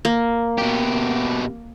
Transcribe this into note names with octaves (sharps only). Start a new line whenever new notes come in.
A#3
B2 G4